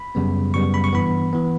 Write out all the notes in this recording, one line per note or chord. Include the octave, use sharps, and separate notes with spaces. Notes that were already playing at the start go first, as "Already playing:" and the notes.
Already playing: B5
F#2 C#3 G3 B3
F#2 C#3 G3 B3 C#6
B5
C#6
G2 E3 B3 B5
E3 B3